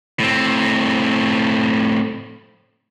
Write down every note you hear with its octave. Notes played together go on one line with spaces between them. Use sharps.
A2 C4